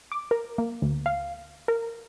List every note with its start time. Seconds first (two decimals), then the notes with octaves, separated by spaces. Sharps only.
0.12 D6
0.31 A#4
0.58 A#3
0.82 D2
1.06 F5
1.68 A#4